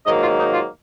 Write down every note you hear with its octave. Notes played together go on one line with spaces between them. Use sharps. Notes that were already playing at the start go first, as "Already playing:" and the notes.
G#2 D#3 F#3 A#3 D#5
F4
D#4
F4